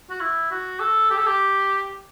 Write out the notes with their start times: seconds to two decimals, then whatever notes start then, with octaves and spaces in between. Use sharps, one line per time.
0.10 F#4
0.20 E4
0.51 F#4
0.80 A4
1.10 G4
1.18 A4
1.27 G4